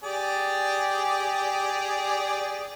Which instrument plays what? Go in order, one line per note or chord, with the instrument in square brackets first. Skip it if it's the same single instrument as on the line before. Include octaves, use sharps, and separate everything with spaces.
[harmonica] G4 G#4 D5